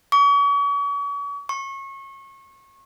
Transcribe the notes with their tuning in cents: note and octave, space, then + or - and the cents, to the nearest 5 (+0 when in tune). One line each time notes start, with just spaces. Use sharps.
C#6 +40
C#6 -30